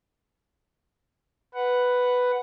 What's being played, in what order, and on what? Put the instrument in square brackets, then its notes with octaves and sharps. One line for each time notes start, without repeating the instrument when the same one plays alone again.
[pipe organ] B4 F#5